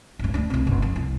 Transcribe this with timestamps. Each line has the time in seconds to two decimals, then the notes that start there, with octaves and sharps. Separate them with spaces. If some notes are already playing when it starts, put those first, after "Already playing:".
0.19 A1 G2
0.34 D2 D4
0.50 C2 C3
0.67 F#1
0.82 F2
0.96 C2